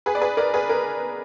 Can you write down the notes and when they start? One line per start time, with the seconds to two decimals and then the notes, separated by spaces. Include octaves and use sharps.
0.06 G#4 B4
0.15 D5
0.22 G#4 B4
0.37 A#4 D5
0.54 G#4 B4
0.69 A#4